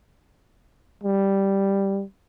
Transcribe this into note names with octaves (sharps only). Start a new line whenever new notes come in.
G3